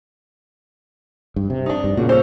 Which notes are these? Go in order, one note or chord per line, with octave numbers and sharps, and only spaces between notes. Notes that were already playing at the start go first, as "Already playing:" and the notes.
G2
C3
D4 D#4
G2
A#2 C#3 F#4
C#4 A4 C5